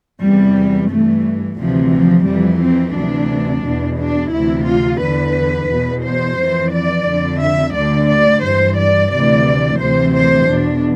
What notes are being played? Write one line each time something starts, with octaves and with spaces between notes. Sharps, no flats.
E2 C3 E3 G3
G2 E3 A3
D2 C3 E3 F3
F3
F2 E3 G3
C4
D2 C3 E3 D4
E2 B2
D4
D2 C3 E3 E4
F4
E2 D3 B4
E2 B2
C5
F2 E3
D5
F2 D3
E5
D2 D3 D5
D5
G2 E3 C5
D5
D2 C3 E3 D5
D2 C3 E3 C5
C5
E2 B2 D4